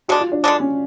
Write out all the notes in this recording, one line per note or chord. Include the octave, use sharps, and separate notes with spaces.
D3 G#3 D4 F#4
F4
D4
D3 G#3 D4
C#4